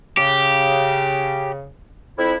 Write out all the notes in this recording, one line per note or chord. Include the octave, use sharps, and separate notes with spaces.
C#3 G4
F2 E4